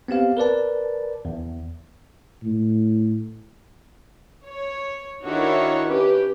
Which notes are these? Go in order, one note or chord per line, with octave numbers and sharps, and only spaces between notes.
B3 C4 G4 F5
A#4 B4 D5 A5
E2
A2
C#5
D#3 D4 E4 F#4 A4 C#5
C#4 G4 B4